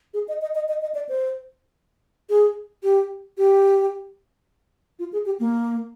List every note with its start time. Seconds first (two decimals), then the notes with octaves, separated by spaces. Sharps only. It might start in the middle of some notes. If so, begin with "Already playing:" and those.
0.14 G#4
0.28 D#5
0.42 D#5
0.55 D#5
0.69 D#5
0.82 D#5
0.95 D5
1.09 C5
2.29 G#4
2.83 G4
3.38 G4
4.99 F4
5.13 G#4
5.26 G4
5.40 A#3